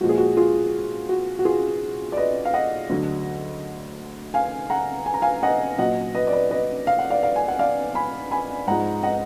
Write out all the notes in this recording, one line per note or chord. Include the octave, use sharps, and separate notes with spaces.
A#2 F3 G#3 F#4
G#4
F#4
F4 G#4
F#4
F#4
F4 G#4
D5
B4 D#5
F5
D#5 F#5
D2 D3 F#3
F5 G#5
F#5 A#5
G#5
A#5
F5 G#5
D#5 F#5
A#2 F#3 D#5 F#5
B4 D#5
D5
B4 D#5
B4 D#5
F5
F#5
D5 F5
D5 F5
G#5
F#5
D5 F5
G#5 B5
G#5 B5
G#2 F3 G#3 F#5 A#5
D#5 F#5